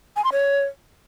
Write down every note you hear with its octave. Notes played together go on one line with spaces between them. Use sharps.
G#5
C6
C#5